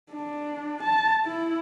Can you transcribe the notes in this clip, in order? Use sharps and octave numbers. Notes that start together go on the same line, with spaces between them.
D4
A5
E4